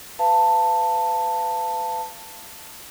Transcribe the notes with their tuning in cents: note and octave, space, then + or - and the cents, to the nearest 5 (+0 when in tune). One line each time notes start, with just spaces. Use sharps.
B4 +30 F5 -30 A5 +15